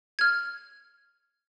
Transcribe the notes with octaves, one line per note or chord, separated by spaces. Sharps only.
F6 G#6